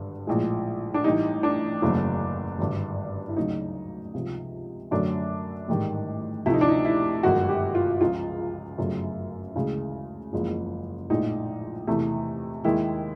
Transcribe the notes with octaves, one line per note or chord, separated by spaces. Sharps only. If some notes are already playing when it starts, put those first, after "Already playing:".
Already playing: G#1 G2 D3
A#1 A2 F3 G#3
D4
A1 A2 E3 G3 D#4
D4
F#1 E2 C#3 F#3 A3
G#1 G2 D3
E4
D2 C#3 F#3 D#4
C#2 C3 F3
F#2 D3 F#3 A3 D4
A1 G#2 D#3 G3
D2 C3 F3 A3 E4
D#4
D4
D#4
E4
G1 F#2 D#3 G#3 F#4
G4
F4
C#2 C#3 F3 G#3 F4
G1 F#2 C#3 F#3 A3
D2 C#3 E3 G#3
F#1 E2 C#3 F3 G#3
A#1 A2 F3 G#3 D#4
E2 C3 E3 A3
D#2 D#3 G#3 E4